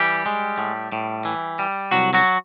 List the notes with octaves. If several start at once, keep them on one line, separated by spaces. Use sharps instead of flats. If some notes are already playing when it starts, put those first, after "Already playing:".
Already playing: E3 G3 G4
G#3
A2
A2
E3
G3
C2 F#3 F#4
F#3 F#4